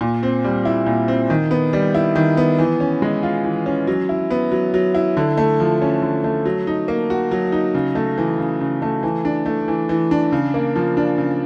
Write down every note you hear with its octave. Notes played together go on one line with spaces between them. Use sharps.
A#2
C4
G3
E4
A#2
C4
D#3
B3
G3
E4
D#3
B3
E3
C#4
G#3
F4
E3
C#4
F#3
E4
B3
F#3
F#3
E4
D3
A3
F3
C#4
D3
A3
F#3
D#4
A#3
F#4
F#3
D#4
C#3
A3
E3
C#3
C#3
A3
E3
D4
A3
E3
E3
D4
C#3
A#3
F3
D4
C#3